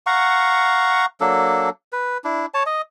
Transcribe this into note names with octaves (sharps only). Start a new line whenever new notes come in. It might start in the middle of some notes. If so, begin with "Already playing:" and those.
F5 F#5 A#5 C#6
F#3 A#3 D4 A4
B4
D4 E4
C#5 A5
D#5